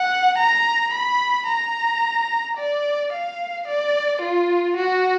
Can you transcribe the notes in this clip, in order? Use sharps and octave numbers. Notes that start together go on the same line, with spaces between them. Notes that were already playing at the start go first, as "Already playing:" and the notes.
Already playing: F#5
A#5
B5
A#5
D5
F5
D5
F4
F#4